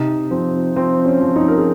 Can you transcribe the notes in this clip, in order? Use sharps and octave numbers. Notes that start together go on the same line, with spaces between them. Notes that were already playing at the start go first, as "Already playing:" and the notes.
Already playing: C3 D#4
F3 C4
F3 C4
C#4
F3
D#4
A#4
G#4